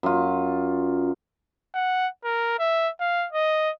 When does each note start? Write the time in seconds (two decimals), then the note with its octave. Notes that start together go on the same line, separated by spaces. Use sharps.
0.03 F#2 F4
1.74 F#5
2.24 A#4
2.59 E5
3.01 F5
3.33 D#5